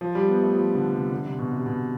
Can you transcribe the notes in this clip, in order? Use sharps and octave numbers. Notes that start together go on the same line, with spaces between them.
F3
G3
B3
A3
F3
D3
C3
D3
C3
B2
C3
B2